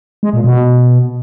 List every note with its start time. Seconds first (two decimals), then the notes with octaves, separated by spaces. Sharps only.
0.23 G#3
0.34 A#2
0.44 B2